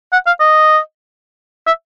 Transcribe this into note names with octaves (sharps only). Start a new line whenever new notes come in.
F#5
F5
D#5
E5